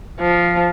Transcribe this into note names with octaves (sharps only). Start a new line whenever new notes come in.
F3